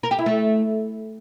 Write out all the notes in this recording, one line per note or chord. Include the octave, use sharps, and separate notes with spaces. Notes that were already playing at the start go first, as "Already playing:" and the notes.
A#4
G4
E4
A3